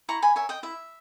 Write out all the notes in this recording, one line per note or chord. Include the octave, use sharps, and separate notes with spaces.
E4 A#5 C#6
G#5 B5
A#4 C#5 E5 G#5
D#5 G5
E4 E5